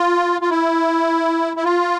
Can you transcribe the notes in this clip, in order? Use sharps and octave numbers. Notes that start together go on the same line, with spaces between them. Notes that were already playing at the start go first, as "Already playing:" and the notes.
Already playing: F4
F4
E4
E4
F4